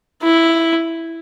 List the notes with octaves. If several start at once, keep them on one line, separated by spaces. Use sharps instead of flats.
E4